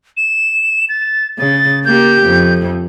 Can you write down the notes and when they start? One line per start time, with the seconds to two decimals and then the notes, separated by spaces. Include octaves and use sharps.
0.17 E7
0.89 A6
1.38 C#3 A6
1.85 A#3 G4 G6
2.27 F2